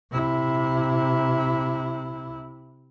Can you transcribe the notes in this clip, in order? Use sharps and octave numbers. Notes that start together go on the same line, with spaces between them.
C3 E4